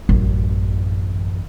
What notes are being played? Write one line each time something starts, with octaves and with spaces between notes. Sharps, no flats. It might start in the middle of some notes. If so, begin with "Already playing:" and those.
A1 F#2